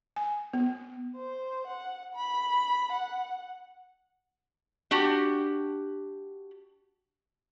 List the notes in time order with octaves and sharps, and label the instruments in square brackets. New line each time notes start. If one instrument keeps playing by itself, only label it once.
[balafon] G#5
B3
[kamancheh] C5
F#5
B5
F#5
[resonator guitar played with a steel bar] D4 F#4 G4